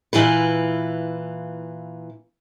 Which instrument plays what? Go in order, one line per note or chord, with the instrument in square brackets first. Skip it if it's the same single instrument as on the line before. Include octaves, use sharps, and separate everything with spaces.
[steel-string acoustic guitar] A#2 E3 E4 F4 B4